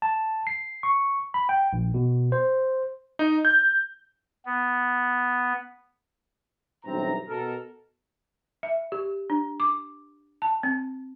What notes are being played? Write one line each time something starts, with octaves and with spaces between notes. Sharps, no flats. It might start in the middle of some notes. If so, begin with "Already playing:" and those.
A5
C7
C#6
B5
G5
A#1
B2
C5
D#4
G6
B3
B1 G2 E3 C4 A#5
B2 A4 A#4
E5
G4
D4
D6
A5
C4